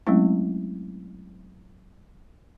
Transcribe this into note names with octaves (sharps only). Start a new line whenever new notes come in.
F#3 G#3 A3 C4 C#4 E4